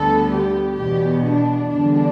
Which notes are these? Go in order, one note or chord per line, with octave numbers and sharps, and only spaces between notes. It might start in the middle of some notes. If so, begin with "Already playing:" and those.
Already playing: D2 D3 G3 B3 A4
G4
E2 B2 B3 G4
D4
E2 D3 G3 D4